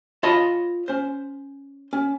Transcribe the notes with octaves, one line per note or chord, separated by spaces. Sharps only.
F4 C#5 D#5 A5 B5
C#4 C5
C#4